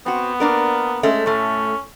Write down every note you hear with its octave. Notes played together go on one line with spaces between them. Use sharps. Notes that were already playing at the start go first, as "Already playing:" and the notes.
B3 C4 F#4
A#3 D4 A#4
G#3 A3 C#4
A2 A3 C#4